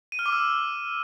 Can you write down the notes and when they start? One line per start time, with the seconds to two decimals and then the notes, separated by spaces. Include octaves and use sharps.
0.12 D#7
0.19 F6
0.26 D6
0.32 E6